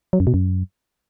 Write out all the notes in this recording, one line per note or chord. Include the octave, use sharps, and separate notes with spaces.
F#3
F#2
B2
F#2